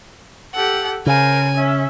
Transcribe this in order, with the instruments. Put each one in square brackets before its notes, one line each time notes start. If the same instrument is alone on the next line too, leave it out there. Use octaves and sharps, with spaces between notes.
[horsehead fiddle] G4 A4 [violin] F#5
[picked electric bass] C#3 [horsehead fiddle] A#4 C5 [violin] G#5
[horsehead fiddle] C#4 E5